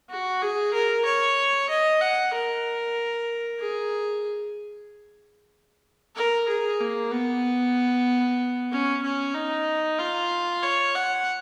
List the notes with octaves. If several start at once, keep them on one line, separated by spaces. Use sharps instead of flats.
F#4
G#4
A#4
C#5
D#5
F#5
A#4
G#4
A#4
G#4
A#3
B3
C#4
C#4
D#4
F4
C#5
F#5